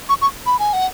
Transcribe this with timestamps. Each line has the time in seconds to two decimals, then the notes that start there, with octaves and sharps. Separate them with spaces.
0.09 C#6
0.22 C#6
0.46 B5
0.59 G#5
0.73 F#5